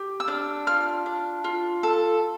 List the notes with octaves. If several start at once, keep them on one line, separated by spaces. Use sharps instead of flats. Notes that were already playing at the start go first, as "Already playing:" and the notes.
Already playing: G4
E6
D4 F6
F4 F6
D4
F4
A4